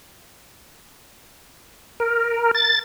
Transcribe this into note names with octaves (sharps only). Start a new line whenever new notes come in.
A#4
A6